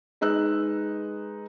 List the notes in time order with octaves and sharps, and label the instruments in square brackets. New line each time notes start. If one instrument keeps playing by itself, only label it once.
[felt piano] G#3 D#4 B4 E6 F#6